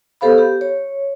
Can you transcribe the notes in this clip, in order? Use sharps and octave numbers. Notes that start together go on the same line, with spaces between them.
B3 G4 A4 C5 F5 B5
G4
C#5